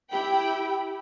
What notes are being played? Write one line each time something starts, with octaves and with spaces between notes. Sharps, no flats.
E4 G4 G5 B5